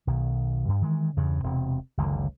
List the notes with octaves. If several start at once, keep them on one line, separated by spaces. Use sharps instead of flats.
B1 B2 D#3
G2
D#3 E3 G#3
E2 G2 C#3
E1 C3 C4
F#1 C#2 D3 D#3